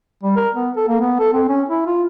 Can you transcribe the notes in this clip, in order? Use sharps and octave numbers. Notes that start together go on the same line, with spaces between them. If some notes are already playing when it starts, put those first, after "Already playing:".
G3
A#4
B3
A4
A#3
B3
A4
C4
C#4
E4
F4